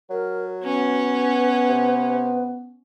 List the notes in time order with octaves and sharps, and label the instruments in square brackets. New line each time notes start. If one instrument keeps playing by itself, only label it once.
[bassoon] F#3 [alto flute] A#4
[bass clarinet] B3 [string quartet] C#4 [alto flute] B4
[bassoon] C3